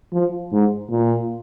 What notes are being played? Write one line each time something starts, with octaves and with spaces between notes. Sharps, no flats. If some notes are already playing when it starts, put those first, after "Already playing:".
F3
G#2
A#2